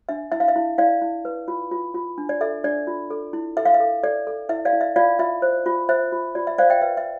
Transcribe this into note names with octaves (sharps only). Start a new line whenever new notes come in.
D4 E5
E4 E5
F5
E5
E4
E4 D5 F5
E4
B4
F4
F4
F4
D4
D5
A4 E5
D4 D5
F4
A4
E4
A4 E5
F5
E5
A4
A4 D5
A4
E4 E5
D5 F5
E4
E5
F4 D5 F5
F4 E5
C5
F4
C5 E5
F4
F4 D5
E5
C5 D5 F5
E5 G5
B4 E5
E5